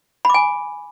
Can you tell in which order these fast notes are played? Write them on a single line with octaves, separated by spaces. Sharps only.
B5 D6 G#5